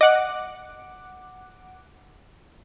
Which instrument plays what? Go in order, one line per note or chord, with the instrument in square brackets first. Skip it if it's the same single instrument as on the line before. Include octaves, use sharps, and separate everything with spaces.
[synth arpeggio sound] D#5 [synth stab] F#5 D6